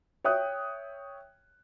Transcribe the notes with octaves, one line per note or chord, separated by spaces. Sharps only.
C#5 E5 G5 D#6 F#6